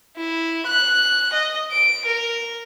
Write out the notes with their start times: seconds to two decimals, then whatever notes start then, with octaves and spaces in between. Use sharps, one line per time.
0.17 E4
0.67 F#6
1.34 D#5
1.71 D7
2.06 A#4